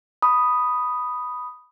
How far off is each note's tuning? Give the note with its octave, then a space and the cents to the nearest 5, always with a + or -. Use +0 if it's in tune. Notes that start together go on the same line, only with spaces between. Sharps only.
B5 +0 D#6 +0